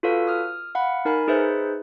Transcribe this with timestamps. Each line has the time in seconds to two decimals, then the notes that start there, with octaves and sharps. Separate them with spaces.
0.03 F4 F#4 A4 B4 C#5 F5
0.27 D#6 F6
0.75 F5 F#5 B5
1.05 D#4 A#4 G#5 B5
1.27 D#4 G#4 B4 C5 E5